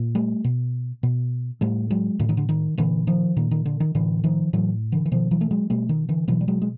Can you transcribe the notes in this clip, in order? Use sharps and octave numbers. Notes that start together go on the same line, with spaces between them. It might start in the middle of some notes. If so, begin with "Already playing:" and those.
Already playing: A#2
G3 A3
B2
B2
A2 G3 A3
F#3 G#3
A2 D3
D#3
D3
D#3
A#2 D3 E3
D#3 F3
A#2 D#3
D#3
D3
D#3
A2 D3 E3
D#3 F3
A2 E3 F#3
D3 E3
E3
B2 D#3 F3
E3 F#3
A3
F#3 G#3
B2 G3 A3
D#3
D3 E3
B2 E3 F#3
G3
F#3 G#3
G#3